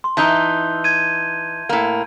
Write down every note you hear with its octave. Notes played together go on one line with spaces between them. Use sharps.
C6
E3 D#4 A5 G6 G7
G#6 D#7
A2 A#3